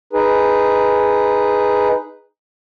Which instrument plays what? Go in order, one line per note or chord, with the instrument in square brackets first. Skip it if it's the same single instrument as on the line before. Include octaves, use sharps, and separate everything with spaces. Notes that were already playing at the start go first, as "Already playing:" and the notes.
[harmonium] D#4 G#4 B4